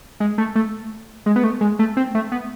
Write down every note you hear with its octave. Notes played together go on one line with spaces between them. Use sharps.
G#3
A3
A3
G#3
B3
A3
G#3
A3
C4
A3
B3